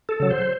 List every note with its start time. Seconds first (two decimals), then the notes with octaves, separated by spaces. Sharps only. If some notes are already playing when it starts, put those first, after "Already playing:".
0.09 A4
0.20 C#3 F#3
0.30 C5